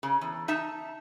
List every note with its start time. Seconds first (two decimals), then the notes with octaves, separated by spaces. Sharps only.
0.03 C#3
0.21 E2
0.48 D#4 E5 A5